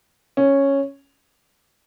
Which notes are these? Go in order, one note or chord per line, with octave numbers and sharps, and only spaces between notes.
C#4